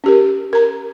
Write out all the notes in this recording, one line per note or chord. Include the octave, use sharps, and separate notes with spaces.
C#4 G4 A#4
A#4 A#5